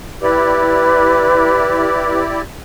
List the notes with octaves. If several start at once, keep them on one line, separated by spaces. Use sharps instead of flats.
E4 G4 B4 D5